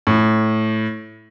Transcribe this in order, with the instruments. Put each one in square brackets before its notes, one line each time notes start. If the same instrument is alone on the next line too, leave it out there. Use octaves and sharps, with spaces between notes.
[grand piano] A2